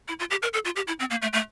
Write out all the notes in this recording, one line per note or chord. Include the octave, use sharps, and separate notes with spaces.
E4
F4
G4
A#4
A4
F4
G4
E4
C4
A#3
A3
A3